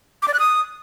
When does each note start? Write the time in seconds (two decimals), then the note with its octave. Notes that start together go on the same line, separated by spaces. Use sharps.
0.22 D6
0.28 D5
0.34 F#6
0.39 D#6